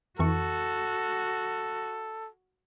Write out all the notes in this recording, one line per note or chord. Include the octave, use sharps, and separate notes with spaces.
F2 E3 F#4 A4 C#6